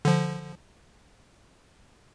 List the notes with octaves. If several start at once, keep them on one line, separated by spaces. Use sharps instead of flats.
D3 F3